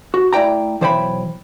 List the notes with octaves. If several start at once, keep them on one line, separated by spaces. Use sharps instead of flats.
F#4
A3 E4 D5 G5 A#5
B1 E3 C5 C#5 G5 B5